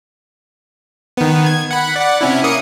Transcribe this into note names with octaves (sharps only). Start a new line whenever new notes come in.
D#3 B3
G#6
F#5 B5
D5 F#5
C3 C#4 E4
A#3 D#6 C#7